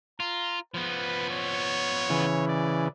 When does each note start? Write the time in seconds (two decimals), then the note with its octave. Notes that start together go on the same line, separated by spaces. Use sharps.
0.20 F4 A#5
0.74 F3 B3 B4
1.31 C#5
2.10 C#3 E3
2.48 D5